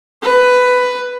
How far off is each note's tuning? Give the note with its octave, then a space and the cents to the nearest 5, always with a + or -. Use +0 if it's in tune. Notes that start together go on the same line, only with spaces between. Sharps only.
B4 +10